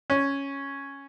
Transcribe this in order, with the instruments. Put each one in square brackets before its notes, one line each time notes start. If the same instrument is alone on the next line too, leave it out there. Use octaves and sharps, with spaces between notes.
[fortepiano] C#4